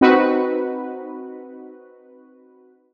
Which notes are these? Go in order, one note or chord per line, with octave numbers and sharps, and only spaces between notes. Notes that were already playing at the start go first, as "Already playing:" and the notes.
C4 D#4 F#4 B4